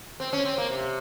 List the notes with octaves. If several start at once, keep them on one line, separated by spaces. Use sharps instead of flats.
C4
C#4
C4
A#3
C3